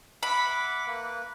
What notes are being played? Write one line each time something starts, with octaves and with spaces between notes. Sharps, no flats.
E5 F#5 B5 D6
A#3 B4